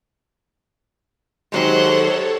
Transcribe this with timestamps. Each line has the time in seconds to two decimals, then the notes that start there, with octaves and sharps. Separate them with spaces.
1.52 D#3 F#3 G#3 G4 A4 C5 C#5 F#5